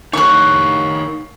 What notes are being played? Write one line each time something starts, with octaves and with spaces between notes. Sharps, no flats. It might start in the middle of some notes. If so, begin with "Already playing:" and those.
D#4 A#4 C#5 C#6 F#6